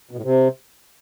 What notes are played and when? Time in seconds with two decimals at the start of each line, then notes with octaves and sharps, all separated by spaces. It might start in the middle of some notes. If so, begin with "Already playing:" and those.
0.11 B2
0.17 A2
0.23 C3